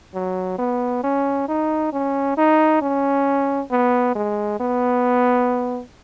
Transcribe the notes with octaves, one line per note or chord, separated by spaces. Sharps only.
F#3
B3
C#4
D#4
C#4
D#4
C#4
B3
G#3
B3